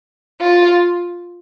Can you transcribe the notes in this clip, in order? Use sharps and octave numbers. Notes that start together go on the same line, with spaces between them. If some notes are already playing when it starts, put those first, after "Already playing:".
F4